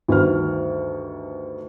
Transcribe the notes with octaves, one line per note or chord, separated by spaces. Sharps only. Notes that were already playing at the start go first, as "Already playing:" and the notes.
D2 G2 D#3 F6